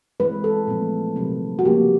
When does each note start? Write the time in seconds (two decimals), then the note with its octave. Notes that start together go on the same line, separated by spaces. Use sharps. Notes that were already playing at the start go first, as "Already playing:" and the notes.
0.20 E3 G#3 C4 B4
0.44 A4
0.67 A#2 F3 A3 C4
1.16 C3 D#3 F#3 A3 C4
1.59 F#4
1.64 C#3 F3 A#3 C#4 G4